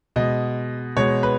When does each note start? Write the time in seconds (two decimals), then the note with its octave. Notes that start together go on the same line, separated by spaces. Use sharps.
0.16 B2 G#3 D#5
0.97 B2 G#3 C#5
1.23 B4